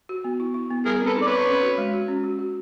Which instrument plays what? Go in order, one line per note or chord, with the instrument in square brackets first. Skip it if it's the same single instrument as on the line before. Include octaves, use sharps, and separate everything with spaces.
[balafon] F#4
B3
E4
E4
B3
[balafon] G3 [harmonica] G#4 A#4
[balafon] C4 [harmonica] A4 B4
[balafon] D#4
[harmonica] D5
B4 C#5
[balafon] C4
C#4
F#4
G#3
F#4
C#4
F#4
F#4